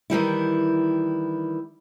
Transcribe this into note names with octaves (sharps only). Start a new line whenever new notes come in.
D#3 E3 G3 E4